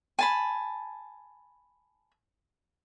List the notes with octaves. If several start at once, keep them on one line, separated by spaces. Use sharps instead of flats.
G#5 A5 B5